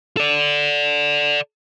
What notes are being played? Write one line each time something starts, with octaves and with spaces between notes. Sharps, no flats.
A4 D5